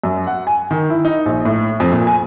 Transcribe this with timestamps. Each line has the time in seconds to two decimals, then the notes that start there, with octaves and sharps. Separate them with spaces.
0.04 F#2
0.27 F#5
0.47 G#5
0.71 D#3
0.90 E4
1.05 D#4
1.26 A#1
1.45 A2
1.80 F2
1.92 A#2
2.07 G#5